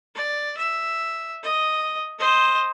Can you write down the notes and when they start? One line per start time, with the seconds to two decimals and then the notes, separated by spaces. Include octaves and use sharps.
0.15 D5
0.57 E5
1.43 D#5
2.20 C5 D#5